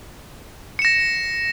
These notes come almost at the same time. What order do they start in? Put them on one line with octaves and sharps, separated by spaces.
C#7 E7 A#6